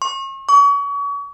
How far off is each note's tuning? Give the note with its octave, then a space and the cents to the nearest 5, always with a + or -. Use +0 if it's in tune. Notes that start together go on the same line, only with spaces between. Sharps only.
C#6 -40
C#6 +35